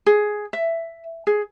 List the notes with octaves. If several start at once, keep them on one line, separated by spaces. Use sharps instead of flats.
G#4
E5
G#4